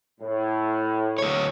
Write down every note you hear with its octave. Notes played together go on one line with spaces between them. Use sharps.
A2
D2 C#5